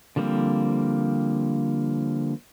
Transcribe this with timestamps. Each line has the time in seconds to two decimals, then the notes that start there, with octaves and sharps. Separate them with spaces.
0.16 D3 F3 G3 A#3 C4